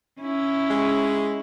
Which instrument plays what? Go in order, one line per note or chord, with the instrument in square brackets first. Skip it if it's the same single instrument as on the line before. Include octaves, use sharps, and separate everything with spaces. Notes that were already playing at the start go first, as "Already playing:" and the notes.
[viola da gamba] C#4 E4
[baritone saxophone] G#3